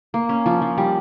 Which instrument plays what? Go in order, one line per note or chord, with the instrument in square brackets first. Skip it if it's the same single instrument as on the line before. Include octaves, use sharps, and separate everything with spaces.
[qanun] A#3
C#4
F3
F3
G3